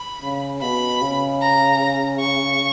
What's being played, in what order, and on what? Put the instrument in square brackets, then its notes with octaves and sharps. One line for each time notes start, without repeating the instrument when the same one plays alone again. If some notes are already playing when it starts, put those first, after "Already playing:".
Already playing: [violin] B5
[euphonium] C#3
[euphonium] B2 [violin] B5
[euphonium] C#3
[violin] A#5
C#6